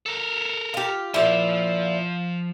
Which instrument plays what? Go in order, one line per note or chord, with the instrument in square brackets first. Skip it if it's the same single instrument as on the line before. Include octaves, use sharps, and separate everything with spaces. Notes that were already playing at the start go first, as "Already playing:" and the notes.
[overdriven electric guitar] A4 A#4
[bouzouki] F4 G4
[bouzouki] A#2 E4 [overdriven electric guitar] F3